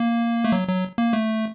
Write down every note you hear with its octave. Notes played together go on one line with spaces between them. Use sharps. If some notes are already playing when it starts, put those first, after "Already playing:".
Already playing: A#3
A3
F#3
F#3
A#3
A3